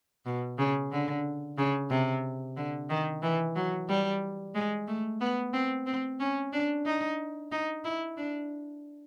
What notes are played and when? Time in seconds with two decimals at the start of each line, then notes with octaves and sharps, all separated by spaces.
0.26 B2
0.59 C#3
0.92 D3
1.58 C#3
1.90 C3
2.57 D3
2.90 D#3
3.22 E3
3.56 F#3
3.89 G3
4.55 G#3
4.87 A3
5.21 B3
5.53 C4
5.86 C4
6.20 C#4
6.53 D4
6.86 D#4
7.52 D#4
7.84 E4
8.17 D4